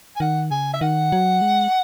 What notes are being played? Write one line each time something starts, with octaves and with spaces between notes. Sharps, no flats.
G#5
D#3 F#5
C#3 G#5
E5
D#3 F#5
F#3
G#3